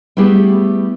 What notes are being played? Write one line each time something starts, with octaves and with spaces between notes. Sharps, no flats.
G3 A3 B3 E4 G4 G#4